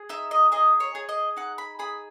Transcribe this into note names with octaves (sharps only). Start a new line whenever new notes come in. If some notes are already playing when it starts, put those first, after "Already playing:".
Already playing: G#4
D#4 E5
D#5
G#4 D#5
C#5
G#4
D#5
D#4 F#5
B5
G#4 B5